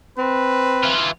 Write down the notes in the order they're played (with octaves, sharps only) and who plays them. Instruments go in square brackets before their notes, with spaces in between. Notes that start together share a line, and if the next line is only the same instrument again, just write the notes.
[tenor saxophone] C4 [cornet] B4
[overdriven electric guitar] E3 F4